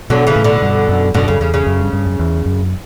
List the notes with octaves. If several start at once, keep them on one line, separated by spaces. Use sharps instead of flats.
B2 D3 F#3
C#3 E3
A2
B2 D3
G2
F#2
F#2 B2 D3
F#2 C#3
E2 C#3
C#3
F#2
G2
G2
F#2
E2
F#2